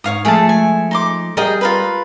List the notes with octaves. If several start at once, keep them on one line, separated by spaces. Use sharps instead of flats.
G#2 C#5 F5 D#6
F3 G#3 A3 G#4 A5
G#5
D#4 C6 D6
G3 G#4 A#4 D#5 F5 G5
F4 A#4 B4